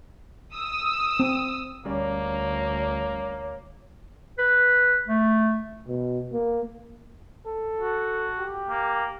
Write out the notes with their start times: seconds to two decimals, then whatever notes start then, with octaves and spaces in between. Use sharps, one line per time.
0.55 D#6 E6
1.20 C4
1.86 D2 G3 A#3 C#4 C#5 D5
4.38 B4
5.08 A3
5.88 B2
6.32 A#3
7.47 A4
7.81 F#4
8.39 G4
8.70 A#3